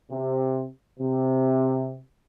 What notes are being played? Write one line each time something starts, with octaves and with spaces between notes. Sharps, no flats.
C3
C3